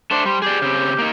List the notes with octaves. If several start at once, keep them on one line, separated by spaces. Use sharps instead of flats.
A3 D4 C5
G3 C5
G4 G#4 D5
C#3 C4
A#3 D#4